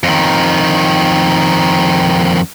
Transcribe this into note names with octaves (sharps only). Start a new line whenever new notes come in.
F2 D#3